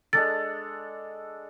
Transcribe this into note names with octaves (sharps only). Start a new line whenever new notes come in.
G#3 D4 A4 A6